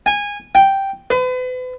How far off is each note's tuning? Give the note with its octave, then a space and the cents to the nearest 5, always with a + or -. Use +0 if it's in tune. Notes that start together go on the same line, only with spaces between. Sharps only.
G#5 -20
G5 -5
B4 +40